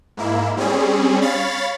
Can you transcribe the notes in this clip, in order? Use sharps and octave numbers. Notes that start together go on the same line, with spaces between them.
G#2 A#3 E4
G3 C4 C#4 G#4
C#5 F5 B5 A6